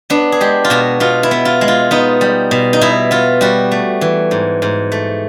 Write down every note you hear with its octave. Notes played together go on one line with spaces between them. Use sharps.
B3 D4
G#4
G#3 G4
F4
B2 F#4
B2 F4
E4
B3
F4
G#3
F4
B3 D#4
G3
B2
D#4
B2 E4
B3 F4
G3 F#4
A3
E3
G#2
G#2
A3